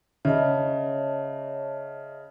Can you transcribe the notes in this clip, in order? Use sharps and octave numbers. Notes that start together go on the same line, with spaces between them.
C#3 C#5 D#5 E5 A5